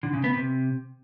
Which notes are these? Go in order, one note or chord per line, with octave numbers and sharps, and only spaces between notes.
D3
C#3
B3
C3